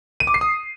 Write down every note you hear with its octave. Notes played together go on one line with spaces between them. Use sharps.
D#7
D6
C7
D#6